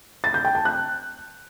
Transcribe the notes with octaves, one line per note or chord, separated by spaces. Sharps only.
A6
G6
G5
A5
F#6